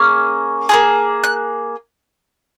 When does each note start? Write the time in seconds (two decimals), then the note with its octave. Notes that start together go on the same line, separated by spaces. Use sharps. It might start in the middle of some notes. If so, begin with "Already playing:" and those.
Already playing: A#3 C#4 G#4 F6
0.69 A#3 F4 G#4
1.24 F#6